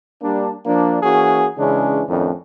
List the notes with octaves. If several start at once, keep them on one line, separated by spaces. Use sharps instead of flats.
G3 A#3 D4
F3 A#3 D4
E3 A#3 C#4 F#4 G#4
C#3 E3 G#3 C#4 D4
F2 A2 D#3 C#4 D4